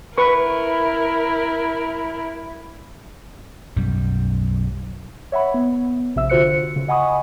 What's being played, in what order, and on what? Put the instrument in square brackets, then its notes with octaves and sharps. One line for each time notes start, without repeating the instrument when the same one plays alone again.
[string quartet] E4 A#4 [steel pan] B4 C#6
[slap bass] B1 F#2 G3
[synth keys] C#5 E5 F#5 B5
B3
A#1 C3 E5 E6
D3 F4 F#4 C5 F#6 C#7
C#3
D#5 F#5 G#5 B5 C#6 D#6